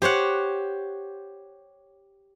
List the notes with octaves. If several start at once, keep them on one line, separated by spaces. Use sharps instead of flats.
G4 C5 C#5 F#5